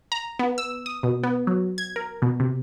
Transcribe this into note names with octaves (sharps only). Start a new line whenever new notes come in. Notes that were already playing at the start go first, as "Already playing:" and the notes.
A#5
B3
E6
D#6
B2
B3
F#3
G#6
A#4
B2
C3